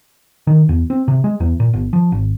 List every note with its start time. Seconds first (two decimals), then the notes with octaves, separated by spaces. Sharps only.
0.47 D#3
0.69 E2
0.90 C4
1.08 C3
1.24 G#3
1.40 E2
1.60 A#2
1.73 G1
1.93 F3
2.12 G#1